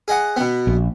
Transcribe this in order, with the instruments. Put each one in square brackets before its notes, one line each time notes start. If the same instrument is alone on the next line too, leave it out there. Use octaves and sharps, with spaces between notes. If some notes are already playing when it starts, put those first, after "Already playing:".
[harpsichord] G#4 D#5 F#5
B2 B3
[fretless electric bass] A#1